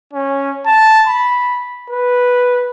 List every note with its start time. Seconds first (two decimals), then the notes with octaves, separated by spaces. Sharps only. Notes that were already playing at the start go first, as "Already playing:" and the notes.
0.14 C#4
0.66 A5
1.07 B5
1.90 B4